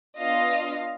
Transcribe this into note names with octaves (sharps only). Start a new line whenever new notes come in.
B3 D4 F4 D#5 F5